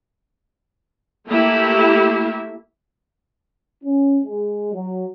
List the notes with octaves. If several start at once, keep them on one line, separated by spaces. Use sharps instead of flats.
A3 A#3 E4 G4
C#4
G#3
F#3